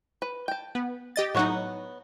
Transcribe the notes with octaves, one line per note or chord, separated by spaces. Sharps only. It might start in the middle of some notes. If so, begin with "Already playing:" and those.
B4
G5 A5
B3
G4 D#5 A6
A2 F#3 B3 D#4 C#5 F#5